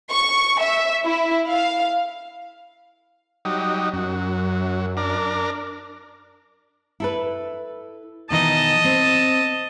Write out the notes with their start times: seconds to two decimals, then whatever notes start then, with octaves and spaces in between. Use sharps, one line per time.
0.10 C#6
0.60 E5
1.04 E4
1.49 F5
3.45 F#3 G3 D#4
3.94 F#2 F#3
4.97 D4 A#4
7.00 E4 A4 B4
8.30 B2 D#3 E3 D#5 A5
8.84 C4